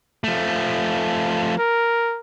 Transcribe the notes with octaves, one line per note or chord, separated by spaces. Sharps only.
F3 A3
A#4